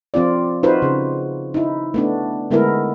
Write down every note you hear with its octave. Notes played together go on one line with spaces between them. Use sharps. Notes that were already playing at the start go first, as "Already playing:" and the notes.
F3 C4 F4 D5
D#4 F4 F#4 B4 C5
C#3
D#4 E4
A3 B3 D4
D3 G#3 A3 B3 E4 A#4